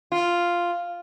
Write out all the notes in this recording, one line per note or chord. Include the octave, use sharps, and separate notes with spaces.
F4